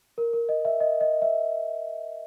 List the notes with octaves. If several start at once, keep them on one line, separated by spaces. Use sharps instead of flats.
A#4
A#4
D#5
E5
D#5
D#5
E5